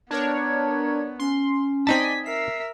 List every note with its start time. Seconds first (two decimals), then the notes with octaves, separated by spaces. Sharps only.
0.11 B3 D4 A#4 C#5 G#6
1.19 C#4 C6
1.87 C4 D#4 D5 D#5 G#5 A5 B6
2.26 A#4 E5 B6 C7